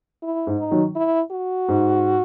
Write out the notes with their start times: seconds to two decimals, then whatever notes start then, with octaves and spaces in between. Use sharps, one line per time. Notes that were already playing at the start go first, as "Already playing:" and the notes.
0.23 E4
0.47 G#2
0.59 D#4
0.71 D#3 F#3
0.96 E4
1.32 F#4
1.69 G#2